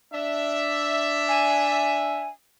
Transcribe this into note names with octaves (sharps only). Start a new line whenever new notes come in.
D4 E5
G#5